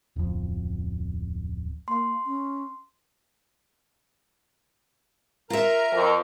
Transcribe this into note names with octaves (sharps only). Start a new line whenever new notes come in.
D1 F2
A#3 C6
C#4
F4 A#4 E5 A#5
F2